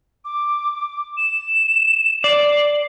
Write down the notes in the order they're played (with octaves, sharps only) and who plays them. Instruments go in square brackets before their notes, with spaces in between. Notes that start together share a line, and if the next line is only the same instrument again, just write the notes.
[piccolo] D6
E7
[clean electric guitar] D5 [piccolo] C7